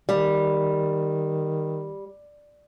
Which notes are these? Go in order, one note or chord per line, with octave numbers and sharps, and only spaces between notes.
D#3 G3